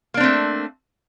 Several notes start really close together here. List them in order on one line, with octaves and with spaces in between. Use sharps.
A#3 D4 C4 A3